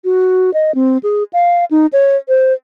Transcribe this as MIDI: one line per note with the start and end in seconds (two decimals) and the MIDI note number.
0.05 0.50 66
0.54 0.74 75
0.75 0.98 60
1.03 1.23 68
1.33 1.65 77
1.71 1.86 63
1.93 2.17 73
2.29 2.53 72